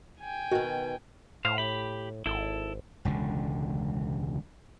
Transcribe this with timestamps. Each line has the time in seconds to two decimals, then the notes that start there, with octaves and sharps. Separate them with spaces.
0.21 G5 G#5
0.51 B2 D#3 F#4
1.45 A2 C5 F5
1.58 G4 B5
2.26 G#1 E4 A4
3.05 E1 C#2 D3